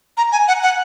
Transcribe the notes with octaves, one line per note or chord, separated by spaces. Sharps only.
A#5
G#5
F#5
F#5